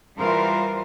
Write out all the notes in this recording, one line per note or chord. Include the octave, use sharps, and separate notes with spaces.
E3 G3 F4 A#4 C5